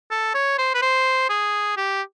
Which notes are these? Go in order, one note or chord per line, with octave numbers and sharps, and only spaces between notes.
A4
C#5
C5
B4
C5
G#4
G4